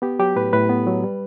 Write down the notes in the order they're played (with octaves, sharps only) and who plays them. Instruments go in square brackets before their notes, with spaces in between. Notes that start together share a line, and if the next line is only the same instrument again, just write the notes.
[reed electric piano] B3 G4
F#3 G4
A2 B4
A2 B4
B3
F#3
G3